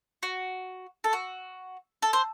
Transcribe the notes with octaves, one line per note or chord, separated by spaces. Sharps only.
F#4
A4
F#4
A4
C5